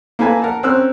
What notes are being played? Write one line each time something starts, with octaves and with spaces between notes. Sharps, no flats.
A#3 E4 A4 B4 G#5 A5
A#4 F#5 A5
C4 C#4 A#4 C5 E6 F#6